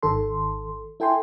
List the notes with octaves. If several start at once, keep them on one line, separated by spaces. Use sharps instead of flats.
G#1 D#3 A4 C6
E4 A4 G5 G#5 C6